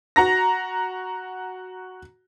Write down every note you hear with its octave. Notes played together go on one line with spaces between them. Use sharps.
F#4 A#5 A#6